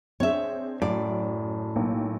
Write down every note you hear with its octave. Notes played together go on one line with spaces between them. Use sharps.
C4 D4 G#4 C#5 E5
F#2 A2 D5
B1 A#3 G5